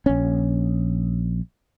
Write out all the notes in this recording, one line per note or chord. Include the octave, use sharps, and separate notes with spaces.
A#1 C#4